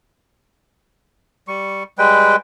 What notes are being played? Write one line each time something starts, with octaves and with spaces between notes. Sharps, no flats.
G3 C#6
G3 G#3 B4 G5